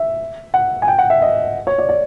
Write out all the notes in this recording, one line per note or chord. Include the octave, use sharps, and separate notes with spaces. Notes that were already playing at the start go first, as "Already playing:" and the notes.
Already playing: E5
F#5
G#5
G5
F#5
E5
D#5
C#5
D5
D5